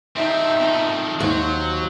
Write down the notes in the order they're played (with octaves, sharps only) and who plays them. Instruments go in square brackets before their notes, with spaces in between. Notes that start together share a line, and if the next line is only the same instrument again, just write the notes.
[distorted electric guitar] G2 C4 [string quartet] D#4 E5
[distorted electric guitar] F2 D#3
[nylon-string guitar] D#2 [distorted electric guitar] F#3 F#4 [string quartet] C5